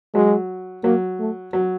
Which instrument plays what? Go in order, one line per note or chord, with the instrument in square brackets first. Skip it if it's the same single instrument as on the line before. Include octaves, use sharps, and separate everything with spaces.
[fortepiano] F#3 [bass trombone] G#3
[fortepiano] F#3 [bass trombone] A#3
[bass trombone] A3
[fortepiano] F#3